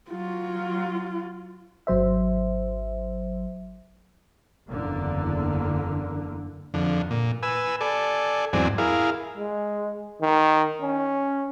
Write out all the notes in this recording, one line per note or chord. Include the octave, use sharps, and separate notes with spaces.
F#3 F4
G#1 F#3 C5 E5
F#1 E2 D3 A#3
F2 D3
A#2
B4 G#5 E6
A4 D5 G#5
E2 G#2 F#3 C4 D5 G#5
E4 G#4 A#4 F5
G#3
D#3
C#4